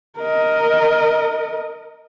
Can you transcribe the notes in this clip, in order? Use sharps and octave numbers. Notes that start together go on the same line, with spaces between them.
A#4 D#5